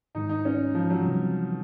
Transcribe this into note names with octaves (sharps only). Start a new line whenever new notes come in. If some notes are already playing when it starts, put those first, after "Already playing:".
G#2 D#3 G#3 D#4
D#4
C#4
F3
F#3
C3 E3 G3 C4